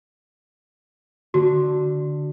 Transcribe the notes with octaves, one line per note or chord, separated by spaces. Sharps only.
D3 F#4